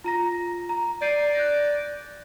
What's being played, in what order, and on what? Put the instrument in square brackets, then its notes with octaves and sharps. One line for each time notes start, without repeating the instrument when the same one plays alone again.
[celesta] F4 A#5 A#6
A#5
[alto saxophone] D5 [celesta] G6 C7 D#7
[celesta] F#6 G6 A#6